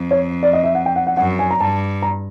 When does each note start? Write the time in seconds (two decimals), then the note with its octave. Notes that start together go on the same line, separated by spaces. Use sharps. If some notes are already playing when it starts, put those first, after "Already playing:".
Already playing: F2
0.11 C#5
0.43 D5
0.53 D#5
0.63 E5
0.75 F#5
0.86 G5
0.96 F#5
1.07 F#5
1.17 F#2 F#5
1.39 G#5
1.51 A#5
1.60 G2 A5
2.02 A#5